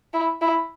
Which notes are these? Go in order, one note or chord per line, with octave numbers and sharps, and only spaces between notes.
E4
E4